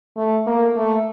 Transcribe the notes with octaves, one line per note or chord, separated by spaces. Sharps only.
A3
A#3
A3